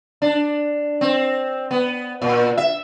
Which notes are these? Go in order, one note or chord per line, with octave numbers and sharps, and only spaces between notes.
D4
C4
B3
A#2
E5